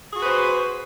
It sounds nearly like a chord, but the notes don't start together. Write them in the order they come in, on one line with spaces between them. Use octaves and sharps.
G#4 F#4 B4 C5